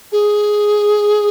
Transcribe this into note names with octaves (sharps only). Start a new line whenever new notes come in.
G#4